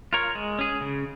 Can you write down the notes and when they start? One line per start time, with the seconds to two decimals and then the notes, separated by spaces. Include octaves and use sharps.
0.13 F4 A#4 C#5
0.35 G#3
0.59 C#4 G#4
0.81 C#3